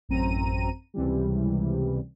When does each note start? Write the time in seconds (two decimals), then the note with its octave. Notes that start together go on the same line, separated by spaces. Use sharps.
0.09 A1 F#2 C4 A#5 D#7
0.94 C#2 C3 E3 G3